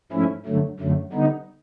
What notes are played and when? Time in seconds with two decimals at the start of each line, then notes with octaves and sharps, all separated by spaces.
0.12 G#2 F3 A3 C#4 E4
0.46 G2 D3 F#3 A3
0.80 F#2 D3 F#3 A3
1.13 D3 G3 B3 D#4